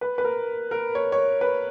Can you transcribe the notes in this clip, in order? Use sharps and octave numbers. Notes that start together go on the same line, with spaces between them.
B4
B4
A#4
A#4
C#5
C#5
B4